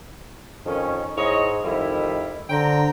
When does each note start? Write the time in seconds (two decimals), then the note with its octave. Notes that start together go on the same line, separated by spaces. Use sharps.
0.66 F2 D#3 C#4
1.17 G#2 E4 C#5 D#5
1.64 F2 D#3 G3 E4
2.50 D3 C5 G5 A#5